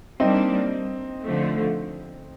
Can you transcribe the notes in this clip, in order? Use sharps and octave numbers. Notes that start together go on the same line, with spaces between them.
G3 A#3 C4 D4 D#4
D3 F3 A3